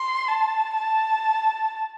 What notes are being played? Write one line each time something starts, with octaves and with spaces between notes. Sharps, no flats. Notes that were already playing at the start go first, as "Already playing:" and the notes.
Already playing: C6
A5
A5